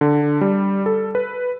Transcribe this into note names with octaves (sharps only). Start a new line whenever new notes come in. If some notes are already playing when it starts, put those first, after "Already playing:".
D3
G3
A4
B4